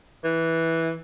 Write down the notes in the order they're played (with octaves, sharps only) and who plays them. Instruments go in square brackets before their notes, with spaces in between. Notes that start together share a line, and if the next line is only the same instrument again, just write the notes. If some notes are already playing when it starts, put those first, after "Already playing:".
[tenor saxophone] E3